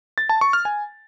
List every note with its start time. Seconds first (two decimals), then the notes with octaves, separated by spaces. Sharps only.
0.18 A6
0.29 A5
0.41 C#6
0.53 F6
0.65 G#5